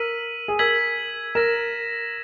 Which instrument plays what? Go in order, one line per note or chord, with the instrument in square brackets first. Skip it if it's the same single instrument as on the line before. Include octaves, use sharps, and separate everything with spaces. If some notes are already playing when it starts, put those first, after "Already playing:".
Already playing: [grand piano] A#4 [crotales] E6 B6 D#7 F#7
[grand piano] G#4
[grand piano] A#4 [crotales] E6 G#6 B6 F#7
[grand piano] A#4 [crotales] E6 A#6 E7